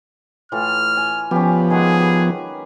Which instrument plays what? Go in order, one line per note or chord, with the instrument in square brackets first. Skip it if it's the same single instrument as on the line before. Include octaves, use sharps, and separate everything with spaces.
[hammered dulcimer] A2 E3 F4 [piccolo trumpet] F6
[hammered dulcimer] G#5
[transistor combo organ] F3 B3 [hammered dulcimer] C#4 G4
[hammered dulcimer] D#3 G#3 F#5 [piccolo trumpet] G#4
[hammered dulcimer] G4 B4